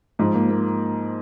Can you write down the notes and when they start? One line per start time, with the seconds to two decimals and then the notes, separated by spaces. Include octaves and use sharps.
0.19 G#2 F3
0.35 A#3
0.51 A#3